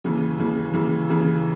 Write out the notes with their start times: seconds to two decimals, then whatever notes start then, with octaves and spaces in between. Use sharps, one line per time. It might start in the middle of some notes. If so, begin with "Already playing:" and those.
0.04 D#2 C#3 E3
0.38 D#2 C#3 E3
0.73 D#2 C#3 E3
1.09 D#2 C#3 E3